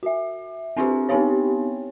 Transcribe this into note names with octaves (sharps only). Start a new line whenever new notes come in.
F#4 E5
C4 D4 E4 F4 G4 G#4
B3 C4 D#4 E4 G4 C#5